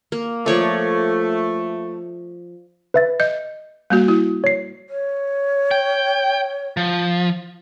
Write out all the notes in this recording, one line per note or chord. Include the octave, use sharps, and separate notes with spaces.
A#3
F3 A3 C#5 D5
B4 E5 A6
D#5 G6
G3 A#3 F#4
E4
C#5 C7
C#5
G5
F3